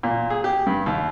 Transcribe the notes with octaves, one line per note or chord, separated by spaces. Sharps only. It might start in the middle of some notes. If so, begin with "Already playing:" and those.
A#2
G#4
G4
G2
D#2